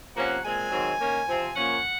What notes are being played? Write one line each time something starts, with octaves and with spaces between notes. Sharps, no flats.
C3 F3 A#3 C#4 F#5
A#2 G#3 C4 G#5
G#2 D#3 F#3 C4
D#3 A#3 C#4
C3 F3 C4
A#2 F3 A#3 C#4 F#5